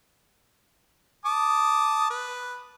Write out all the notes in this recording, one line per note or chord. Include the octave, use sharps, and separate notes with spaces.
A5 D6 D#6
B4